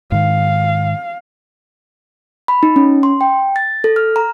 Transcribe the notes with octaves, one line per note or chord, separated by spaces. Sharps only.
G#2 D#3 F5
B5
D#4
C#4
C6
G5
A6
A4
F6
A#5